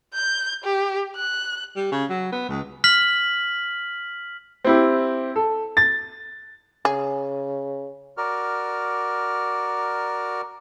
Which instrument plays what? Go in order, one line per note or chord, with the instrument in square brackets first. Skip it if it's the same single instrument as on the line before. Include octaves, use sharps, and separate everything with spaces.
[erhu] G6
G4
F#6
[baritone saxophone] G3
C#3
F#3
B3
C#2
[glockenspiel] F6 B6 F#7
[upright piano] C4 E4 G4
A4
A6
[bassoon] C#3 [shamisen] G#4
[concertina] F#4 A#4 D5 F6